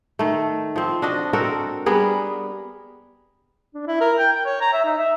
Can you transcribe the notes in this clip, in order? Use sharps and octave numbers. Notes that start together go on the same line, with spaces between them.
D#3 A3
F3 C4
D4 F#4 D#5
C4 F#4 A4 A#4
G3 B3 G#4 A#4
D4
E4
A#4
G5
G5
C#5
A#5
E5
D#4
E5